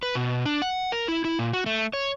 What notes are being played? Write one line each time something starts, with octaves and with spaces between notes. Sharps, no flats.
B4
B2
D4
F#5
A#4
E4
E4
A#2
F#4
A3
C#5